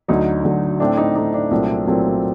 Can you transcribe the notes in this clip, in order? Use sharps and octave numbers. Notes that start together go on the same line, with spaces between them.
D2 D3 F#3 D#4
D2 D3 F#3
A2 A3 C4 D4
D#4
A2 A3 C4 D#4
D4
C2 A#2 F#3 A3 C4
C2 A#2 F#3 A3 C4